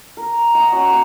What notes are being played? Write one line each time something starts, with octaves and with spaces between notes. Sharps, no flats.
A#4
D#5 F#5 A#5
C#4 F#4
A#3 C#5